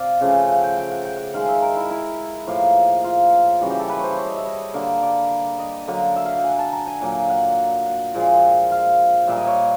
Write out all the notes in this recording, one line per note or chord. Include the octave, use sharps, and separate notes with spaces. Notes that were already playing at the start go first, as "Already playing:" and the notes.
Already playing: C3 D5 F5
C#3 F3 A3
F#5
G5
G5
F#5
G5
F#5
D#3 G#3 F5
E5
A#4
E4
E4
A2 F3 A#3
F4
C#3 E3 G3 F#4
G4
A4
B4
C5 C#5
C#5
D#5
E5
D#5
D3 G3 A#3
D5
D#5
D3 F#3 A#3
E5
F5
F#5
G#5
A5
A#5
G#5
A#2 F#3 A#3
F#5
F#5
A#2 F3 G#3
F5
A#2 G3 A#3 E5
D#5
C#5